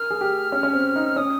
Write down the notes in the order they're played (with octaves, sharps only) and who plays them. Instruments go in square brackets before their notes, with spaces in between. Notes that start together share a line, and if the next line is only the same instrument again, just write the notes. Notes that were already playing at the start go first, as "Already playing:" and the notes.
Already playing: [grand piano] A#4 [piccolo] F6
[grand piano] G#4
G4
C#4
C#4
C4
D#4
[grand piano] C#4 [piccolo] D#6